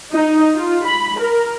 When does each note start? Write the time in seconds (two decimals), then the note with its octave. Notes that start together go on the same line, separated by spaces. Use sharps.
0.12 D#4
0.54 F4
0.85 B5
1.19 A#4